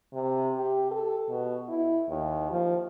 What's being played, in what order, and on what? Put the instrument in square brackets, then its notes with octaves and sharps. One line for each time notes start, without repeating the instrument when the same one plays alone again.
[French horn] C3
G4
A4
B2
E4
D#2
F3